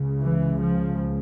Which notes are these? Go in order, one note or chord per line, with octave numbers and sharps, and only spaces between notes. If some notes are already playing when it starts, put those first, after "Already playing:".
Already playing: C#2 C#3
E3
F3